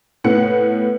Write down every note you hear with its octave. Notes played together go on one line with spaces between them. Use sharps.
A2 B3 F#5 C#7